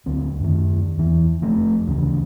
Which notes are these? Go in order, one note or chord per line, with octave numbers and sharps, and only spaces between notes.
D2 C4
F#2 D#3
E2 E3
F1 F3 A3
D2 C#3 E3